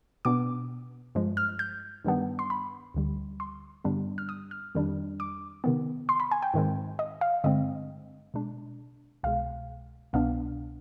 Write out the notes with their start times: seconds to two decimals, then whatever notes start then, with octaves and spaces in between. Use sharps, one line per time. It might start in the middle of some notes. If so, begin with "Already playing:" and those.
0.25 B2 B3 D4 D6
1.15 G2 F3 G#3
1.37 F6
1.59 G6
2.05 G2 D#3 G3 B3 D4
2.39 C6
2.50 B5
2.94 D2 D3 G3
3.40 C6
3.84 G2 D3 G3 B3 D4
4.18 F6
4.29 D#6
4.51 F6
4.75 F2 D#3 G3 D4
5.20 D6
5.64 C3 D#3 B3
6.09 C6
6.20 B5
6.31 G#5
6.43 G5
6.54 G#2 D#3 G#3 C4
6.99 D#5
7.21 F5
7.44 G2 D3 G#3 C4 D#5
8.34 B2 G#3 D4
9.23 C2 B2 G#3 F5
10.13 C2 B2 B3 D4 F5